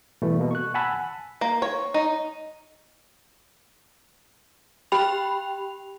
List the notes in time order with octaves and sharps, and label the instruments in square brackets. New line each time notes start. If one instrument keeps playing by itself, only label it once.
[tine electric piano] B2 E3 G3 A3
B2 A#3
C#6 F#6
F#5 G#5 A5 B5 E6 F#6
[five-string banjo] A#3
C#5
D#4
[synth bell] G4 G5 B5 F7